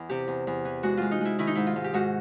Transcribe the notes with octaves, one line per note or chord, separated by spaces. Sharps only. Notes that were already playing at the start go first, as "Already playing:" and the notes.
Already playing: E2 E4
C3 G4
E2
E2
E3
G#3 F#4
G#3 F4
D#4
G#3 E4
D#3 E4
D#4
G#2 E4
F4
G#2
G4
G#2 F#4